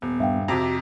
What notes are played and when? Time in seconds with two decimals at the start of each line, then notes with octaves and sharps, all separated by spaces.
0.02 D#1 B3
0.20 G2 E5 F5 G5
0.48 F2 C3 F#4 A#5 D6